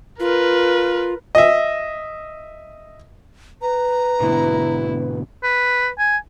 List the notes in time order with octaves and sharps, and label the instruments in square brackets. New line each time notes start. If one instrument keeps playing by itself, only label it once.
[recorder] F4 [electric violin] A#4 B4
[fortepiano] D#5 E5
[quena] B4 [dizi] A#5
[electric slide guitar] G#2 B2 D3 [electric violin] E4
[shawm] B4
G#5